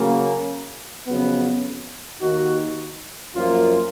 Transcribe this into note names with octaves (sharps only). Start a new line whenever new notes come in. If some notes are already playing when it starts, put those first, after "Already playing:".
Already playing: C#3 F#3 A#3
F2 C#3 F#3 B3
D#2 D#3 A#3 D#4 F#4
F#2 F3 A#3 F4